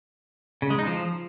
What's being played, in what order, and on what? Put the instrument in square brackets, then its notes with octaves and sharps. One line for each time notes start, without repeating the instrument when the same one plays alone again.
[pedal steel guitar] C#3
G#3
D#4
F3